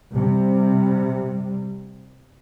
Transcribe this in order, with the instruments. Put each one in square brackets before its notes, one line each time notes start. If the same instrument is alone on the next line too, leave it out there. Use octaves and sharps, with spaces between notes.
[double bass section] C3 G3